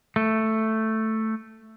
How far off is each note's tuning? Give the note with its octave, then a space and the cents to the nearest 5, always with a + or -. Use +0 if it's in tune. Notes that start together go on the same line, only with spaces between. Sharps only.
A3 +5